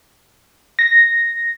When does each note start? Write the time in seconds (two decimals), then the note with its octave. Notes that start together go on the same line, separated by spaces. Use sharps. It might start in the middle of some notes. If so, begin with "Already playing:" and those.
0.79 A#6